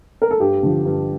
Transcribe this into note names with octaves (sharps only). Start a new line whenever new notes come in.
A#4
A4
G2 G4
D3 F3
G2